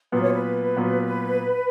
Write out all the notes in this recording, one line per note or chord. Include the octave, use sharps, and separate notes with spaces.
A#2 F#3 B3 B4
C#5
B4
A#2 F#3 B3